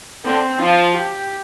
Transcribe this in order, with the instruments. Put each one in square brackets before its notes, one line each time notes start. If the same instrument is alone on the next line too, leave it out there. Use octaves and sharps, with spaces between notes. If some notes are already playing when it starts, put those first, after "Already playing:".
[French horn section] D3 [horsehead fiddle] C4
[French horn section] F3 [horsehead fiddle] F4
[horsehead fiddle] G4